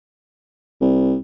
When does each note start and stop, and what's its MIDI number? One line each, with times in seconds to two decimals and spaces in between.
0.81 1.17 36